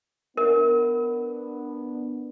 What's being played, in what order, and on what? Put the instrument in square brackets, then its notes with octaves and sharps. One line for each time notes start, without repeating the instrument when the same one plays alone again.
[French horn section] B3 D4 [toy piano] A#4